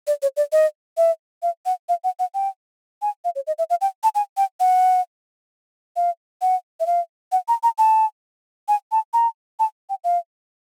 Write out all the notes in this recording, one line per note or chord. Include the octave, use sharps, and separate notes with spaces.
D5
C#5
D5
D#5
E5
F5
F#5
F5
F#5
F#5
G5
G#5
F5
C#5
D#5
E5
F5
G5
A5
G#5
G5
F#5
F5
F#5
E5
F5
F#5
A#5
A#5
A5
G#5
A5
A#5
A5
G5
F5